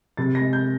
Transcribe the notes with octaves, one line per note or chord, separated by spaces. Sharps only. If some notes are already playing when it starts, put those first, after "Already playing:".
C3 A6
A#6
G#3
G6